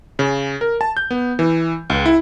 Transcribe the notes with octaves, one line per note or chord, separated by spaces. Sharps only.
C#3
A#4
A5
G6
B3
E3
C#2
E4